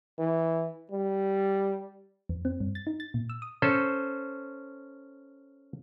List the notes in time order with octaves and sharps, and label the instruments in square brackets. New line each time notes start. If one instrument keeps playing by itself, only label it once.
[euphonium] E3
G3
[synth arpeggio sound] F2
C4
G2
A6
D#4
A6
A#2
E6
D#6
[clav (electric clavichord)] C#4 A4 C5